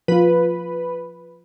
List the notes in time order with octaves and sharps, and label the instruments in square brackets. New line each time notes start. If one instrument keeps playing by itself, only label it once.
[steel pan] F3 F4 [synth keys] B4